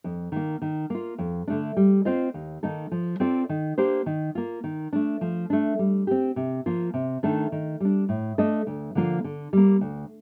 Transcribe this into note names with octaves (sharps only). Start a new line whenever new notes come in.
F2
D#3 A#3
D#3
A#3 F4
F2
D3 A3 D4
G3
C4 F4 C5 D#5
D#2
D#3 A#3 D#4 A4
F3
C4 F4 A4 D5
D#3
A#3 D4 G4 C5
D#3
A#3 F4
D#3
A3 D4
F3
A3 D4
G3
C4 G4
C3
F3 A#3 F4
C3
D#3 A3 D4 A4
D#3
G3 D4
A2
A3 D4 A4 D#5
D2
D3 F3 A#3 F4
D3
G3 A#3
D2